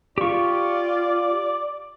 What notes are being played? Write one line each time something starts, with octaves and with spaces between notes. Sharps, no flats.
F4 G4 D5 C#6